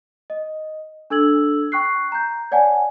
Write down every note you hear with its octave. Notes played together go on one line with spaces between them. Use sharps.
D#5
D4 A4 E6 G#6 F#7
G5 C#6 F#6 C7
A#5 G6
C#5 D5 F#5 G#5 A5